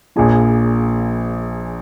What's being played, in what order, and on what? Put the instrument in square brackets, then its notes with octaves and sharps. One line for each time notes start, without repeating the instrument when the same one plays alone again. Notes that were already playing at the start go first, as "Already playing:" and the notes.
[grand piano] A#1 A#2 F3 G#4 G#5